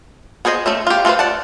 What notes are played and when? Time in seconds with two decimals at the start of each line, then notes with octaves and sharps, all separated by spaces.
0.45 B3 G#4 C5 D5 D#5
0.66 A3 C#4 E5
0.87 F4 G4
1.05 A3 F4 A4 B4 C5
1.19 D5 F#5 A5